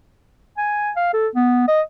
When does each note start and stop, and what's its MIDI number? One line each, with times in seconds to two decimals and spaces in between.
0.57 0.91 80
0.96 1.11 77
1.14 1.28 69
1.35 1.68 59
1.68 1.81 75